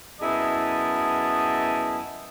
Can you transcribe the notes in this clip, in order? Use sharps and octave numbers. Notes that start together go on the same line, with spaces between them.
F#2 B3 E4 G#4 D#5 A5